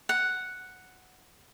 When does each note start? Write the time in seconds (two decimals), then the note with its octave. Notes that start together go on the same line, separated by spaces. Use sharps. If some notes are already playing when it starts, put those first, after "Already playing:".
0.09 F#5